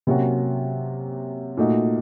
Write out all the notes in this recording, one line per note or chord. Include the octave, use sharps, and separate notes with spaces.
C3 F#3 A#3 C#4 F#4
A#2 A3 D#4 F#4